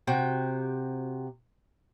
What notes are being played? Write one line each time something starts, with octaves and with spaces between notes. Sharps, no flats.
C3 F#4 G5